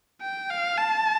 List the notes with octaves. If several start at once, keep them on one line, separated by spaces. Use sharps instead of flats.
G5
F5
A5